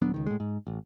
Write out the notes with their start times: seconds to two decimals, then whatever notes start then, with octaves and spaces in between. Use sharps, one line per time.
0.02 D#1 F#3 B3 D4
0.14 C#2 D#3
0.26 A2 G#3
0.40 G#2
0.67 A1